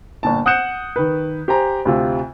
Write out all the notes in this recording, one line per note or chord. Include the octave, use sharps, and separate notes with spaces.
G1 A#2 A5
F#5 D#6 F#6 G6 C#7 E7
D#3 B4
G4 C5 G#5 A#5
D2 C3 F4